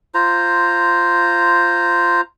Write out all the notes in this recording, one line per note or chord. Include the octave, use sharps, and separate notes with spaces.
F4 C5 A#5